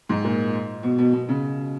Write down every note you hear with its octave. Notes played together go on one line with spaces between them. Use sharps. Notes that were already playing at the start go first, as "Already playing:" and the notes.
G#2
A#2
B2
B2
B2
C#3